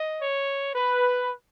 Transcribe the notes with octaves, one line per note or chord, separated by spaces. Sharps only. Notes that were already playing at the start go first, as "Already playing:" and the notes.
Already playing: D#5
C#5
B4